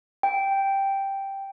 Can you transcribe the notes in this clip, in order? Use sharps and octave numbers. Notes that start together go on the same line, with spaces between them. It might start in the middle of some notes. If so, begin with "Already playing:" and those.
G5